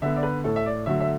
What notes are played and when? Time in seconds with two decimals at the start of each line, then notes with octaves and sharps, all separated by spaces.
0.02 D3 B3 E5
0.16 D5
0.23 B4
0.44 A2 A3 A4
0.56 E5
0.66 D5
0.86 D3 F#3 A3 E5
1.00 E5